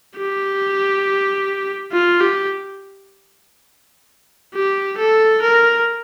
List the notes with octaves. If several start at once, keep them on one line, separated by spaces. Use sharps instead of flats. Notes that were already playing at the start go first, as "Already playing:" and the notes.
G4
F4
G4
G4
A4
A#4